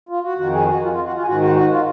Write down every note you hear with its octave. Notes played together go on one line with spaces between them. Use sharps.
F4
F#4
F2 D#3 F#4
G#4
F#4
F4
F4
F#4
F4
G#4
G#2 D#3 F#4
F#4
F#4
F4